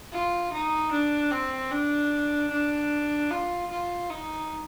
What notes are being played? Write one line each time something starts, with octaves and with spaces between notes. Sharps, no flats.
F4
D#4
D4
C4
D4
D4
F4
F4
D#4